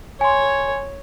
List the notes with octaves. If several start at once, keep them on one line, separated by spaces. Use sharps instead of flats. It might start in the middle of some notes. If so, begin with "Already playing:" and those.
C#5 G#5 C6